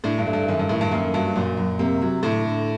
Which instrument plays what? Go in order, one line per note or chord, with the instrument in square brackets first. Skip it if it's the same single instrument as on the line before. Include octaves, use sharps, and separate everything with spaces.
[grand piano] A2 [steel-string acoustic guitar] D4
[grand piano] G2
[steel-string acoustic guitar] A3
[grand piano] G2
[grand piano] F#2 [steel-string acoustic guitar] D#3
[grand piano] G2
[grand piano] A2 [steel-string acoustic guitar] D#3
[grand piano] G2
[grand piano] F#2 [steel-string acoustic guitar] A#3
[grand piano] G2 [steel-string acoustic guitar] F#3
[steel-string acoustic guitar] F#2 [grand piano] A#2
[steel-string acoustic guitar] F#2
[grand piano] C3 [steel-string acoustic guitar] A#3
[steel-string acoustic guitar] F#3
[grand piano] A2 [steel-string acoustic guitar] D3
[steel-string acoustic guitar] D3